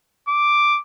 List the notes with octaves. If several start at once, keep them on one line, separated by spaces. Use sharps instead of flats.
D6